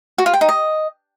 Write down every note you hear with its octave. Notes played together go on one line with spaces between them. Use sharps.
F#4
F4
G5
D#4
D#5